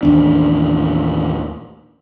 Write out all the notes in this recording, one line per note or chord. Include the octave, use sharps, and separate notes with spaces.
A1 D#2 D4